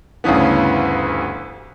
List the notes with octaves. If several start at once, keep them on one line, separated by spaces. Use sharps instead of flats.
D2 G2 C#3 E3 B3